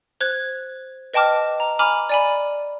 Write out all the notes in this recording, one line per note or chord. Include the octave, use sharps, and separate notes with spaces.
C5 F#6 G#6
B4 D#5 G5 A5 D6 F6
A#5
G#5 A#5 B5 D6 F6
D5 G#5 B5